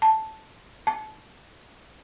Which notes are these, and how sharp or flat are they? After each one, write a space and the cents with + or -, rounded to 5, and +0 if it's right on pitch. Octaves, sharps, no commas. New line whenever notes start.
A5 +0
A5 -25